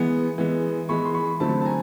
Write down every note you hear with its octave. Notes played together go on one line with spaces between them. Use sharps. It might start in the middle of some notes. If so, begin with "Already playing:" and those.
Already playing: E3 G#3 B3
E3 G#3 B3
E3 G#3 B3 B5 C#6
C6
B5 C#6
D3 F#3 A3 C4 A5 B5
A5
G#5 A#5